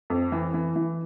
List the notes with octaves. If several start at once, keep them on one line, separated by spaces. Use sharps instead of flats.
F2
E3
E3
E3